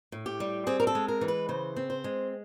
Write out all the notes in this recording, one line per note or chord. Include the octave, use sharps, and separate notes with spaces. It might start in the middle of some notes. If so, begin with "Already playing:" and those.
A2
G4
G3
C4 G#4
A#4
A4
G#3
A#4
E3
B4
C#3 C5
C4
C5
G#3